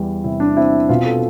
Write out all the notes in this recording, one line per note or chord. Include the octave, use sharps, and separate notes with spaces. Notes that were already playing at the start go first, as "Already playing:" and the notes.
Already playing: E2 G3
C3 E4
D4
C4 E4
B2 F4
A4